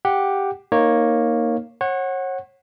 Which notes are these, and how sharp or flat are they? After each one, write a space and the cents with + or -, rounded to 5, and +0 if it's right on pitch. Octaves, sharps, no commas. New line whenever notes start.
G4 +0 F#5 +0
A#3 +0 D#4 +0 C#5 -15
C#5 -35 F#5 +0